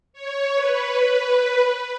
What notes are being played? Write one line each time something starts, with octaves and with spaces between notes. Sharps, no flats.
C#5
B4